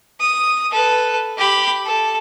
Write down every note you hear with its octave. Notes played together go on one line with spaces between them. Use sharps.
D#6
A4 B4
G4 B5
A4